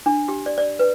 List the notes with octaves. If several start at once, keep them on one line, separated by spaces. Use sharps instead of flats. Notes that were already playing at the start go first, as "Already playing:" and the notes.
D4
G4
D5
D5
B4